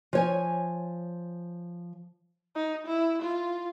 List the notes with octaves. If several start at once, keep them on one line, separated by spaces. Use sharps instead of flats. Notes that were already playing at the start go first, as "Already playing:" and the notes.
F3 C#5 G#5
D#4
E4
F4